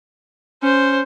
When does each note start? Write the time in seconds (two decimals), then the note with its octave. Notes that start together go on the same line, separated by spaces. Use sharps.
0.63 C#4 C5